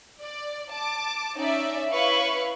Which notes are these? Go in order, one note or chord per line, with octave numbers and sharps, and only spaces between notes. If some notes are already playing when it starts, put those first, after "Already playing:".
D5
A5 D6
C#4 D#4 D5 E5
E4 B4 C#5 F5 B5 C#6